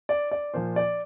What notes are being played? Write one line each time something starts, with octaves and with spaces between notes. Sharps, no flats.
D5
D5
A#2 F3 C5
D5